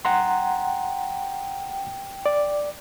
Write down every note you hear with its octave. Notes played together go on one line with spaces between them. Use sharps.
F#5 G5 A#5 C6
D5